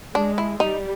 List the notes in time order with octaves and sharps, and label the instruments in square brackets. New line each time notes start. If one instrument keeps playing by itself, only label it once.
[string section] G#3 [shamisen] D4
[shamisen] E4
[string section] G3 [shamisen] D#4